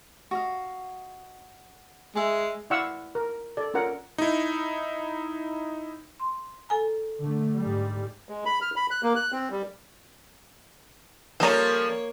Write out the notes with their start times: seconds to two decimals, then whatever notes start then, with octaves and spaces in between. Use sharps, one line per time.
0.31 F#4 D#5 F5
2.15 G#3 G#4 E5
2.70 E4 D5 F5 F#5 C#6 E6
3.15 A#4
3.57 A4 D5
3.74 C#4 F4 A#4 F#5
4.18 D#4 E4
6.20 C6
6.69 A4 G#5 A#5
7.21 D3 A3
7.56 G#2 G3
8.29 G#3
8.45 B5
8.61 F6
8.76 B5
8.91 F#6
9.03 A#3
9.16 F#6
9.32 C4
9.51 G3
11.40 F3 G3 A#3 C#4 A4 C#5 A#5